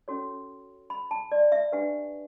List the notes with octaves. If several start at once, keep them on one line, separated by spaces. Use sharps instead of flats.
C#4 F#4 A4 C#5
B5
A5
D5
E5
D4 G4 B4 F#5